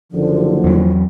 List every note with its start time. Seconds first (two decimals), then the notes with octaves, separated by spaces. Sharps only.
0.12 F#1 D3 F3
0.64 E2 F#3